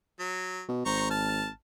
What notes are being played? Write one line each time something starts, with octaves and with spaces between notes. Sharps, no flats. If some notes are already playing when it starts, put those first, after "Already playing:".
F#3
B2
G#1 C5 A#5 C#6
A5 F6